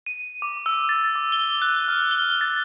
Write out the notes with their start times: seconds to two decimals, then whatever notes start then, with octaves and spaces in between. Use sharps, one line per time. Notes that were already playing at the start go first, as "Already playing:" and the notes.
0.06 D#7
0.42 D6
0.66 E6
0.89 A6
1.15 D6
1.32 G7
1.62 F#6
1.88 F6
2.11 G7
2.41 A6